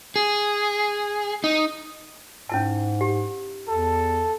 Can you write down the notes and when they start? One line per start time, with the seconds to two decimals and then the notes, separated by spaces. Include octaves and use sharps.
0.16 G#4
1.44 D#4
2.49 G#2 C#4 E4 A5
3.01 G4
3.68 E2 A4